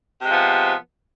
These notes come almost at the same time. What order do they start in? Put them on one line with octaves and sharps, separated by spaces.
C3 G#3 F3 B3